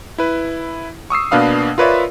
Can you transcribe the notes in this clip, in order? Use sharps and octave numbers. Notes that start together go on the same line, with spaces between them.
E4 B4
C#6 D#6 E6 C7
B2 A#3 D4 B4 F5 D#6
F4 A#4 B4 C#5 D5 E5